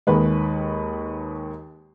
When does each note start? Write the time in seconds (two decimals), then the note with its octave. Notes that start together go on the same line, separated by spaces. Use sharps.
0.07 D#2 D#3 G#3 B4